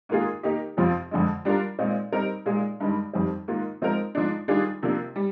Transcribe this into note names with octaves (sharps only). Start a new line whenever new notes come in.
G#2 D#3 A#3 F4 G#4
D#3 A#3 D#4 G4
F2 C3 F3 C4 F4
F2 D3 G#3
G3 D4 F4 A#4
A#2 G#3 C4 D#4
G3 C4 D#4 A#4
A#2 G#3 D#4 G#4
G2 D#3 G#3
F2 D#3 G3 C4
G#2 D#3 A#3 F4
F3 G#3 C4 D#4 A#4
G#2 F3 G#3 D4
D#3 G3 D4 F4 G#4
C3 F3 A#3 D4
G3